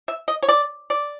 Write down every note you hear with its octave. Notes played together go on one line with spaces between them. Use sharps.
E5
D#5
C#5
D5
D5